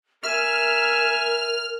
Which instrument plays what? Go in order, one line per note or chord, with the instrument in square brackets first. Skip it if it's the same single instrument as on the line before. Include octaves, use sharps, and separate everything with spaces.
[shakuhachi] A#4 [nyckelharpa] E5 G#5 [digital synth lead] F6